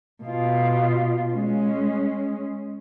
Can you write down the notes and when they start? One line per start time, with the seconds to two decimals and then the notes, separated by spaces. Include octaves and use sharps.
0.24 B2 F4
1.31 G#3 C#4